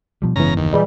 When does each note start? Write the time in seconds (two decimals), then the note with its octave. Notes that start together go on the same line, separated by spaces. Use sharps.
0.22 B2 F3 G3
0.36 F#1 G#2 C#3 E3 B3 A#5
0.57 D#2
0.73 A#2 E3 G3 G#4 D#5